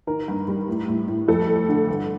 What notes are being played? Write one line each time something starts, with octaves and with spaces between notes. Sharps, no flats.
D#3 A#4
G2
G3
A2
A2
A2
F2 A4
A3
D3
G2